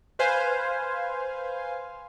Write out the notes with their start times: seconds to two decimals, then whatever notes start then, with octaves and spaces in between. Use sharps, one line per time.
0.19 B4 C5 F5 G#5